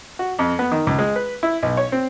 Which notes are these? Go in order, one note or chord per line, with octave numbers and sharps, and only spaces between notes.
F#4
F2
B3
D#3
C#2
G#3
B4
E4
B1
C#5
C4